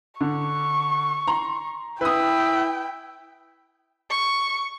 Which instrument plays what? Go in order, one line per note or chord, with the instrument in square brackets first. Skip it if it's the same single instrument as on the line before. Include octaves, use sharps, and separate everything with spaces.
[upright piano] D3 [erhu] C#6
[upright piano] A#5 C6
[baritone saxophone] E4 [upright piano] B4 D#6 [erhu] G5
[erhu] C#6